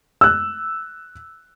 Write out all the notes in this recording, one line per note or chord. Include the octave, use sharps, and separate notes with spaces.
E6 F#6